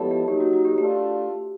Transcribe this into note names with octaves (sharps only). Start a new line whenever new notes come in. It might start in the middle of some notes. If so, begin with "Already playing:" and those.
Already playing: F3 G#3 B3 E4 G4 A4 C#5
G4
F#3 A#3 D#4 G4
F#4
F#4
G4
A3 D4 F4 G4